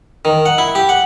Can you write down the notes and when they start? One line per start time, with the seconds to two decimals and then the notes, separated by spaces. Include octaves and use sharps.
0.25 D#3
0.46 F#5
0.58 E4
0.75 G4
0.89 F#5